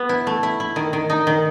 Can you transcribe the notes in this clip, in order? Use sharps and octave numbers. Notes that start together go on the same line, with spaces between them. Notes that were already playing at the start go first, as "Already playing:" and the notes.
Already playing: B3
E4
A3
E4
E4
D#3
D#3
D#4
D#3